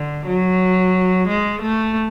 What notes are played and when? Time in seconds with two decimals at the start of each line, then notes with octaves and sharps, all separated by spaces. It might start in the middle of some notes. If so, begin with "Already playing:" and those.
Already playing: D3
0.27 F#3
1.28 G#3
1.62 A3